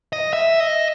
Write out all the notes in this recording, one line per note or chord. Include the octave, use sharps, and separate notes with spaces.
D#5
E5
D#5